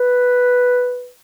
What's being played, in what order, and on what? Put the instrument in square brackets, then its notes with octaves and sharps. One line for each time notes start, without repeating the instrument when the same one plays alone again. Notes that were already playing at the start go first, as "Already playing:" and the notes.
Already playing: [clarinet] B4